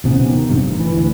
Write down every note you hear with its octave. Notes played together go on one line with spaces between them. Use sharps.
D#1 C3 B3 C#4
D#3
F1 G2 C3
A1
E3
D2